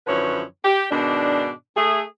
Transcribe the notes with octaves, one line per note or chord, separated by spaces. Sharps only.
F#2 D3 F3 E4 B4 C#5
G4
G#2 B2 D#3 D4
A3 G#4